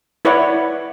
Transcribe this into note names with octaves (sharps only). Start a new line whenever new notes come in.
E4 B4 C#5 D5 F#5